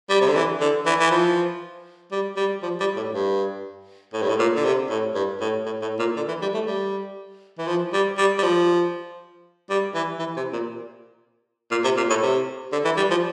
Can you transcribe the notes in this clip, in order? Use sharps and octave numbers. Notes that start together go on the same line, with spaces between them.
G3
C3
D3
E3
D3
E3
E3
F3
G3
G3
F3
G3
A2
G2
A2
G2
A2
A#2
D3
C3
A2
G2
A2
A2
A2
A#2
D3
E3
G3
A3
G3
E3
F3
G3
G3
G3
F3
G3
E3
E3
C3
A#2
A#2
C3
A#2
A2
C3
D3
E3
G3
F3